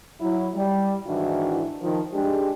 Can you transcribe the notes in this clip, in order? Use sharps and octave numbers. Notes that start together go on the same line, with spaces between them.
F#3 E4
G3
G#2 D#3 E3 D4 E4 F#4
D#3 F3
G#3 D4 G4